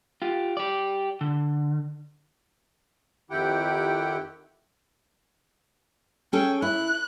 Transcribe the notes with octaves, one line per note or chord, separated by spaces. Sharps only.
F4 G4
G4 D5
D3
F2 D#3 E4 G4 F#5 G5
C#4 G#4 A4 G5
E4 F#6